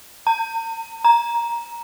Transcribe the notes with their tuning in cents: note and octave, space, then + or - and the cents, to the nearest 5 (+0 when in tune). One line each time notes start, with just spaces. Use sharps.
A#5 -45
A#5 +5